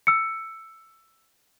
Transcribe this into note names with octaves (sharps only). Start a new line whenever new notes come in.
E6 C#7